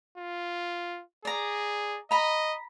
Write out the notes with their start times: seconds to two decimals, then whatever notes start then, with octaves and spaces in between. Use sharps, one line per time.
0.18 F4
1.25 G#4 D5 A#5
2.11 D#5 A#5 B5